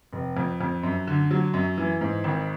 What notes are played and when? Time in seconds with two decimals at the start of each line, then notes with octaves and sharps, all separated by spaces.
0.13 F1
0.37 F2
0.61 F2
0.83 F#2
1.07 D3
1.31 F#3
1.54 F#2
1.78 E3
2.01 G#2
2.24 G#1